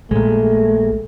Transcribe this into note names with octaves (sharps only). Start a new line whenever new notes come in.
A#1 A#2 G#3 A3